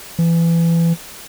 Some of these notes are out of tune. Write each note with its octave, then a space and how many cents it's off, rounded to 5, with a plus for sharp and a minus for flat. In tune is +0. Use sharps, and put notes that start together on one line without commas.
E3 +25